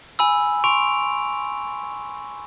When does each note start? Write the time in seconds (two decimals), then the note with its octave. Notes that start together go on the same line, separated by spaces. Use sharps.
0.19 G#5 B5 E6
0.64 C6 C#6 D7 F7